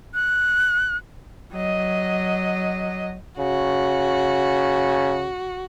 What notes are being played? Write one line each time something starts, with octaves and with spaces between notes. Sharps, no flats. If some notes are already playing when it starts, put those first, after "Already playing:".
F#6
F#3 D#5
C#3 F#4